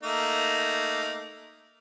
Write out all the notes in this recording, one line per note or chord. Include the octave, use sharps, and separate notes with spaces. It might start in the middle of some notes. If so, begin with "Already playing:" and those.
A3 A#3 D#4